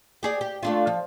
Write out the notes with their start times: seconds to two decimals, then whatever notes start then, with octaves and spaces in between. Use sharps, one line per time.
0.23 G4 G#4 D5
0.41 G4
0.63 A3 D4 F4
0.87 F3